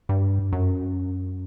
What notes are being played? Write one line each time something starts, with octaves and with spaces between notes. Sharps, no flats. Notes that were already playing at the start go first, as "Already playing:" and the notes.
G2
F#2